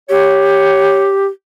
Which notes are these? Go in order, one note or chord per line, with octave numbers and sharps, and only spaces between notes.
G4 C#5